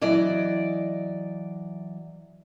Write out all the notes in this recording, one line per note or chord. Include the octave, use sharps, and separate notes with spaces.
E3 F#3 D5 D#5